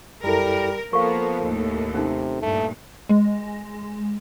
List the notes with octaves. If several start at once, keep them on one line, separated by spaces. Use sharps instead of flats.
F#2 G3 E4 A4 A#4
F3 A#3 B3 A4 A#4 F5 A#5 C#6
D#2 A2
C3 C#4 D#4
G2 A#2 A3
G#3